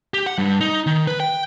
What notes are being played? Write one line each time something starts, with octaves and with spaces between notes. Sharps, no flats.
G4
F#5
G2
D#4
D#3
B4
G5